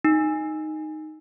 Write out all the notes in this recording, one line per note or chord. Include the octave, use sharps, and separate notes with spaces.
D#4